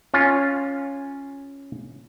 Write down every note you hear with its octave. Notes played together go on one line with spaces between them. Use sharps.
C#4 F4